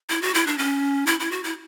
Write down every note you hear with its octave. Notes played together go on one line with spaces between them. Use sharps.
E4
F#4
E4
D4
C#4
E4
E4
F#4
E4